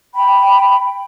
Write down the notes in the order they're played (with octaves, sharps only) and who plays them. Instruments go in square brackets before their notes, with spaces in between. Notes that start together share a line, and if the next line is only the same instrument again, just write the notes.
[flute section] G5 B5